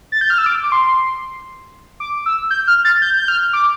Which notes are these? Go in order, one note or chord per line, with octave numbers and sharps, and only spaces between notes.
A6
G6
F6
E6
D6
D6
C6
D6
E6
G6
F6
A6
G6
G6
F6
D6